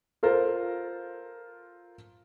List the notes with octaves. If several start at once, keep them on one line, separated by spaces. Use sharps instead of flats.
F4 A4 A#4 C5